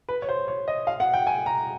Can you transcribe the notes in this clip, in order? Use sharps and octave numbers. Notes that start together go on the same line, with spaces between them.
B4
C#5
C5
C#5
D#5
F5
F#5
G5
G#5
A#5